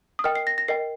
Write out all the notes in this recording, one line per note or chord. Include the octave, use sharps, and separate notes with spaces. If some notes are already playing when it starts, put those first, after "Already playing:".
D#6
A#4 D#5 G5 F6
C7
A#6
A#6
A#4 D#5 G5 C7